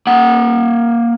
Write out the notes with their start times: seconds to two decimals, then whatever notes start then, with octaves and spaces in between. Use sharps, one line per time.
0.07 A#3 F#5